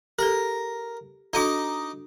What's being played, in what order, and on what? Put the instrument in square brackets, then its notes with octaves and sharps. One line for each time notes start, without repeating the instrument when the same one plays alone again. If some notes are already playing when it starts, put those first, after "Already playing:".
[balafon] G4 A4 [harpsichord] A#4
[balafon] D4 F#4 A4 [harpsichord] D#4 D6